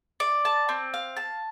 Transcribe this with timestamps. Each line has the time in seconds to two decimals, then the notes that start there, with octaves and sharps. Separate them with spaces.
0.20 D5
0.45 A5
0.69 C4
0.94 F5
1.17 A5